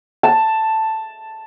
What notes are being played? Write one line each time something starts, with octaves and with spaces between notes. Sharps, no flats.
A5